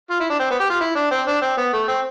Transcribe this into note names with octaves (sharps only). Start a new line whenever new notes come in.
F4
E4
D4
C4
B3
G4
F4
E4
D4
C4
D4
C4
B3
A3
C4